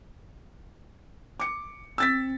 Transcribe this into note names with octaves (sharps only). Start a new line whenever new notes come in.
D6 C#7
C4 E6 A6 B6